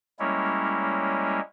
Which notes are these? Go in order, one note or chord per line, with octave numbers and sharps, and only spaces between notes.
G3 G#3 A#3 C#4 E4 C#5